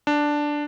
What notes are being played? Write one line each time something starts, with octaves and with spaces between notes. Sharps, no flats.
D4